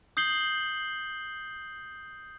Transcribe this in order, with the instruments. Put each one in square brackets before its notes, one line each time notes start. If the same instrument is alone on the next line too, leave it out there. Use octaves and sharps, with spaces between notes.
[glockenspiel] D#6 G6 C7 F#7 G7